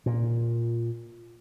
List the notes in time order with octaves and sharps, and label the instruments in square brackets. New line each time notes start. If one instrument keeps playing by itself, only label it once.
[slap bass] A#2